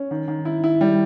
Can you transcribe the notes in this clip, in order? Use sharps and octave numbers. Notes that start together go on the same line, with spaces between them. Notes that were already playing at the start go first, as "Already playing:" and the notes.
Already playing: C#4
D#3
D#3
E4
E4
G3